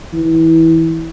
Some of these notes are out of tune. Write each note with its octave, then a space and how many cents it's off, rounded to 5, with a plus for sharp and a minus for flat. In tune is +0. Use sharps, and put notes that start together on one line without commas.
E3 -20